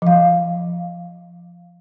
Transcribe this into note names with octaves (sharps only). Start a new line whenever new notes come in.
F3 F5